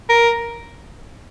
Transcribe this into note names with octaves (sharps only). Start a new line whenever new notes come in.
A#4